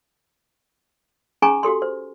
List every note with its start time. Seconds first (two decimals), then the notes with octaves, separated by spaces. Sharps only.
1.42 C#4 D#4 G#4 G#5 A#5 C#6
1.63 F#4 G4 A4 C6
1.82 C5